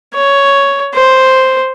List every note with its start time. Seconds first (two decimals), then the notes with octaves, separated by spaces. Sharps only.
0.15 C#5
0.95 C5